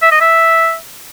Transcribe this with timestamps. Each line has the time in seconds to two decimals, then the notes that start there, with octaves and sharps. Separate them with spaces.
0.02 E5
0.12 D#5
0.21 E5